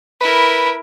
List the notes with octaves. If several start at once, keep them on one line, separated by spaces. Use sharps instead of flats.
E4 A#4 B4